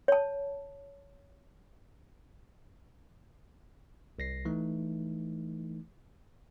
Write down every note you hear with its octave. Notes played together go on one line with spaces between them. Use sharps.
C#5 A5
C2 A#6 C7
E3 A3 D#4